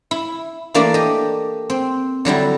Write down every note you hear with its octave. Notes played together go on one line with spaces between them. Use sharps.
E4
E3 A3 A#3 D4 D5 A5
G4 D#5
C4
D3 F#3 G3 E4